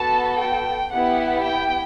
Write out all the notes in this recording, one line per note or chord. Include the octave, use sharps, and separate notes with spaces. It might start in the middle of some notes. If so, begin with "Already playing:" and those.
Already playing: B3 F#4 A4 A5
G5
B3 E4 G4 F#5
G5